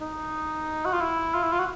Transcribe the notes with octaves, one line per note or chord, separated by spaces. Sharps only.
D#4
F#4
F4
E4
F4
E4
F4
F#4